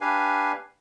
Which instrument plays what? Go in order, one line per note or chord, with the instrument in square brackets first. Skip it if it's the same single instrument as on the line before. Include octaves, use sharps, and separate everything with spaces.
[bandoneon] D4 G4 B4 F5 G#5